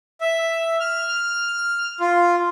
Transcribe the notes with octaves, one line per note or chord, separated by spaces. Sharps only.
E5
F6
F4